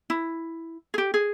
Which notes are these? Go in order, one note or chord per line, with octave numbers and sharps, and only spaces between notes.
E4
G#4
G4
G#4